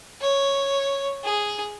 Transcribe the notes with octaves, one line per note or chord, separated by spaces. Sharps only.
C#5
G#4